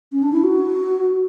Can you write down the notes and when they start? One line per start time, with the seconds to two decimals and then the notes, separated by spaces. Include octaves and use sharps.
0.12 C#4
0.22 D4
0.33 E4
0.44 F#4